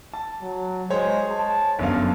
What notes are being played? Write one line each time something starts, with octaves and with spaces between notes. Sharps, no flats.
A5
F#3
G#3 C5 C#5
A5
G1 F#2 F5